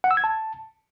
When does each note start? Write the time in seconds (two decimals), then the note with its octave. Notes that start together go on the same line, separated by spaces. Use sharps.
0.04 F#5
0.11 E6
0.17 G#6
0.24 A5